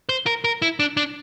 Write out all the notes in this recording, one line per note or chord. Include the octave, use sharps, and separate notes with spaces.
C5
A#4
A#4
E4
D4
D4